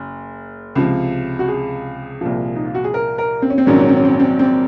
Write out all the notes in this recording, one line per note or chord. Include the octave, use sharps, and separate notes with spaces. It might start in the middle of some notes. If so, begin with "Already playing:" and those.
Already playing: F#1
C#2 C3 F3
F#4
G#4
C2 A#2 F3
D#4
F4
F#4
G#4
A#4
A#4
C4
C#4
C4
A#1 G#2 D#3 F#3 C#4
C4
C#4
C4
C#4
C4
C#4
C4
C4